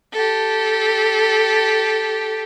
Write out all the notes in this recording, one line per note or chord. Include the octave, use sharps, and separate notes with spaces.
G4 A4